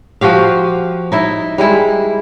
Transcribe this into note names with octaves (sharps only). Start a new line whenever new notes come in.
F3 F#4 G4 F5
D#4 E4 E5
G3 G#3 E4